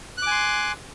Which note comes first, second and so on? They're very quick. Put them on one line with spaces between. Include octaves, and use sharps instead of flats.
F#6 D6 G#5 C6